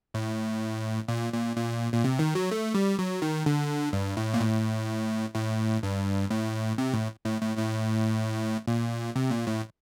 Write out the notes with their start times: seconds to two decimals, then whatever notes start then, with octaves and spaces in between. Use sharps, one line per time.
0.14 A2
1.08 A#2
1.33 A#2
1.56 A#2
1.92 A#2
2.04 C3
2.19 D#3
2.35 F#3
2.51 A3
2.74 G3
2.99 F#3
3.22 D#3
3.46 D3
3.93 G2
4.17 A2
4.34 A#2
4.40 A2
5.35 A2
5.83 G2
6.30 A2
6.78 C3
6.94 A2
7.25 A2
7.41 A2
7.57 A2
8.68 A#2
9.16 C3
9.31 A#2
9.47 A2